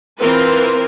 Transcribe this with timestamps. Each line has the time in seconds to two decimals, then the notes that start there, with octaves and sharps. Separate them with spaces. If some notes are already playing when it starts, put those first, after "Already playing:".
0.18 E3 C4 F4 A#4 B4